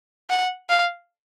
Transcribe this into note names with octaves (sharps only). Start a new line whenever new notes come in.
F#5
F5